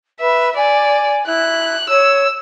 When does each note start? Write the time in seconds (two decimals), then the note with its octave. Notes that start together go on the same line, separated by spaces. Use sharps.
0.20 B4 E5
0.56 D5 G#5
1.26 E4 F#6
1.89 C#5 E6